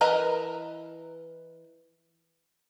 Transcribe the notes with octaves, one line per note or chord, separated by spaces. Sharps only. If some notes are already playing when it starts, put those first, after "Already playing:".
E3 A#4 B4 D#5 A#5